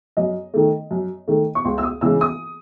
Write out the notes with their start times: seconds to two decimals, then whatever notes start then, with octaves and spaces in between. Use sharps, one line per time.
0.17 F#2 D#5
0.54 D#3 A3
0.91 F#2
1.28 D#3 A3
1.55 C#6
1.65 C#2 C6
1.78 E6
1.83 D#6
2.01 C#3 E3 G#3 E6
2.21 D#6